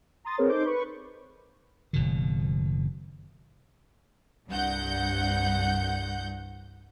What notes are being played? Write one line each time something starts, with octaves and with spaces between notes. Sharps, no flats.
A#5 C6 D#6 A6
C4 G#4 A#4 B4 C#5
D#4 A4 C5 C6 D6 G6
B4 B5 C#6
F#1 B2 D#3
C2 G2 F#5 G6